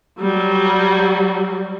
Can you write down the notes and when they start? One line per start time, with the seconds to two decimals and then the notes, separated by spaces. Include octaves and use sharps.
0.20 F#3 G3